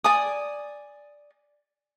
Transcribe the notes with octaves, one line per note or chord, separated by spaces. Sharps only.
D5 G#5 D#6